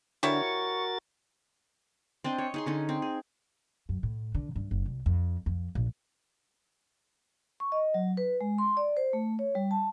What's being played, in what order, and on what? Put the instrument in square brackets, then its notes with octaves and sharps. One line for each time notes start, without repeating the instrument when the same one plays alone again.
[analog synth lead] D3 [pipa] G3 E4 C#5 [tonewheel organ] F#4 A#4 A6
[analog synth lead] C#6
[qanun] C4 D4 C5 D#5
C#5
D#4 G#4 C6
D3 C#4 D#4
C4
G#4
[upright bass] F#2
A2
D3
G2
F#1
C2
F2
F2
A#1
[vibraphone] C#6
D#5
F#3
B4
G#3
C6
D5
C5
A3
C#5
G3
A5